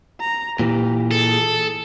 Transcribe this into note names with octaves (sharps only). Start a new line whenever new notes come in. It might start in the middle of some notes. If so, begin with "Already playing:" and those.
A#5
A#2 E3 G4
G#4 A4